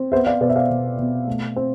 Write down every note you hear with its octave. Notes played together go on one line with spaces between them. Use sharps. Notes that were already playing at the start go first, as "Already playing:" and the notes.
Already playing: C4
B3 C5 E5
D5 F5
B2 B4 D5
E5
D5 F5
B2
B2
A3
C4